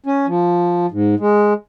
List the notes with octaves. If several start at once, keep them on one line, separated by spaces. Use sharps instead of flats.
C#4
F3
G#2
G#3